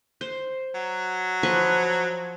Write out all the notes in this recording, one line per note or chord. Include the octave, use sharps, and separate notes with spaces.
C5
F#3
F3 B4 C#6